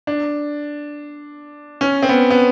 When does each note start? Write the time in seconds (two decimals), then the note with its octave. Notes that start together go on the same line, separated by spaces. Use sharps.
0.07 D4
1.81 C#4
2.03 C4
2.09 B3
2.31 B3